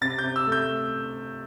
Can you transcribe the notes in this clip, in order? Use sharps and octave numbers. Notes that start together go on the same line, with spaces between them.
C3 A6
G6
C3
E6
A3
G6